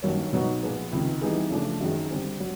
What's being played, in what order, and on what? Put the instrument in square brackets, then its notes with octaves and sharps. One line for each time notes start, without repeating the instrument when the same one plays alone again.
[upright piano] G2 D#3 F#3 A#3 C#4
B2 F#3 B3 D#4 F#4
A#2 F3 G#3 B3
C#2 C3 D#3
E3 G3 B3 D#4 G#4
C#3 F3 A3 D4
F#2 D#3 G#3
D3 G3 C4
F#3